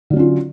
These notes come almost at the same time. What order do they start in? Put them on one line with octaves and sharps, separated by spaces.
D3 F#3 C#4 F4